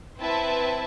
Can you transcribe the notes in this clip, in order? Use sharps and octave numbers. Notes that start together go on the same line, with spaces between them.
C4 E4 B4 E5 A5